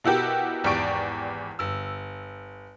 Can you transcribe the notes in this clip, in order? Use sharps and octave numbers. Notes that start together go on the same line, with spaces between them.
B2 E4 F#4 G4 A#4
G#1 E2 G4 D5 C#6 D7
G1 E6